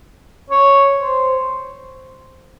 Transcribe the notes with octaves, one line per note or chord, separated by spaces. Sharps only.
C#5
C5